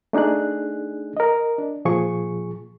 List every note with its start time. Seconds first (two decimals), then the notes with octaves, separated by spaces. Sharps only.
0.13 A3 D4 D#4 G#4 F#6
1.17 A#4 D#5
1.58 D4
1.85 A#2 F3 G#4 C#6